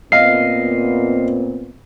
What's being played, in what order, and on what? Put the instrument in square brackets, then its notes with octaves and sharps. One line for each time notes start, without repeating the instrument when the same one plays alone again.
[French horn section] A#2 B3 C4 [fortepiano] D#5 F5 [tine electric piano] C7